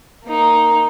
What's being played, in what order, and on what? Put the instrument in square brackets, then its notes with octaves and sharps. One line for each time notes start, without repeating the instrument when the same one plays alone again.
[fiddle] A#3 D#4